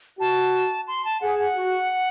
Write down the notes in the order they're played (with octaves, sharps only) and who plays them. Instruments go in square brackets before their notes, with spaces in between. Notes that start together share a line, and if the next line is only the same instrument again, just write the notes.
[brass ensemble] F#4 [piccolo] A5
[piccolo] C6
A5
[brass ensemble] G#4 [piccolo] F#5
[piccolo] F#5
[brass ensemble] F#4